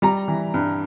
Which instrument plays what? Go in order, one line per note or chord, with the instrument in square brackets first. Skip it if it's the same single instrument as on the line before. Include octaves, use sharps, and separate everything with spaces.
[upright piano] G3 A#5
E3
G2